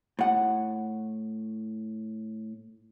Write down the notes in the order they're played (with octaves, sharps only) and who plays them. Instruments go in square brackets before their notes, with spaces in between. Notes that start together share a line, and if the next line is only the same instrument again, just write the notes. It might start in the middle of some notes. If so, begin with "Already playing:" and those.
[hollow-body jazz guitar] A2 F#5